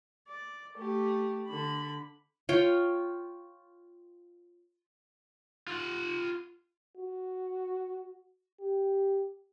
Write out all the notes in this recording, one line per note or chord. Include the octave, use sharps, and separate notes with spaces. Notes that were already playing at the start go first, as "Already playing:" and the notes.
D5
A3 G4
D3 B5
F4 C#5 G5
F4 F#5
F#4
G4